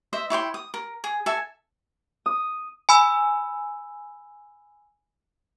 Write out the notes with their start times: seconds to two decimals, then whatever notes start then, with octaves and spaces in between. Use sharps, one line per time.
0.13 C5 D#5 E5
0.30 E4 C#5 G5 C6
0.54 D#6
0.74 A#4
1.04 G#4
1.26 A4 E5 G#5
2.26 D#6
2.89 G#5 B5 E6